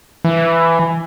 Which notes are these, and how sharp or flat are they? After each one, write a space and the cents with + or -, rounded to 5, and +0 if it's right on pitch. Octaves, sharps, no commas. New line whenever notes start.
E3 +15